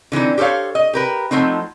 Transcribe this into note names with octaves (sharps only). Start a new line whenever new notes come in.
D3 E3 C4 D#4
G4 A4 C5 C#5 F5
D#5
G4 A#4 B4
F3 F#3 A3 C4 D#4